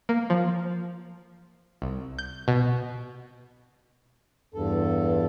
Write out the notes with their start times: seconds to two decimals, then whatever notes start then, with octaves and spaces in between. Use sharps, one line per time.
0.09 A#3
0.30 F3
1.82 C2
2.18 G6
2.48 B2
4.54 E2 G2 A4